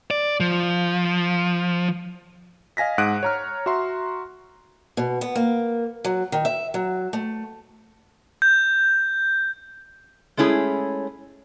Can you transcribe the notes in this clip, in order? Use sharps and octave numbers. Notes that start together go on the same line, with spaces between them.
D5
F3
D#5 F5 G#5 A#6 B6
G#2 F#5 D#6 F#6 D7 D#7
C#5 A#5 F6
F#4 E5 A#5 C6
B2
B3
A#3
F#3
D#3
E5
F#3
A3
G6
G#3 A3 C#4 E4 G#4